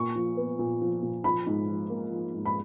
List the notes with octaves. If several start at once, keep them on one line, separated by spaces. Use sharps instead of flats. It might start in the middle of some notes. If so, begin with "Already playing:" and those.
Already playing: A#2 A#3 C#6
F3
B3
A#2
F3
A#2
F3 B5
G#2
F3
A#3
F3
G#2
B5